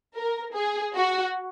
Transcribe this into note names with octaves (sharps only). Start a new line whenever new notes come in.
A#4
G#4
F#4